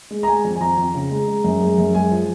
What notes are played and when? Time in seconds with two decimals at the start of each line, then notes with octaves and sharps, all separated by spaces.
0.11 G#3
0.23 A#5
0.27 G#3 G#5
0.45 F2
0.56 G#5
0.61 F2 A#5
0.78 F2
0.95 C#3
1.11 G#3
1.28 G#3
1.44 F#2
1.61 G#3
1.78 F#2
1.95 G#3 G#5
2.12 F3